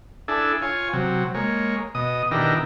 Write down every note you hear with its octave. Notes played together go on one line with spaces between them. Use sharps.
D4 E4 G#4 A4
F4 C#5 G#5
C3 F#3
G#3 A#3 C#5
B2 D#5 D#6
B2 D#3 D4 E4 G4 A#4